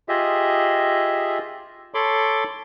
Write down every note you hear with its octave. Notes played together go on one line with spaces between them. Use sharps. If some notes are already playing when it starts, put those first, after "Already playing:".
F4 G4 G#4 D#5 E5
A4 C#5 B5 C6 D6